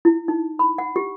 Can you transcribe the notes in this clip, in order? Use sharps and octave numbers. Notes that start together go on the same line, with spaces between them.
E4
D#4
B5
F#5
G4